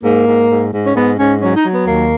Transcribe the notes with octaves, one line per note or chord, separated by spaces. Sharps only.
G#2 A#3
G#2
G#2
G#2
C#4
G#2 B3
G#2 C#4
F#3 C#4
D#4
F#3
B3
D#2 A#3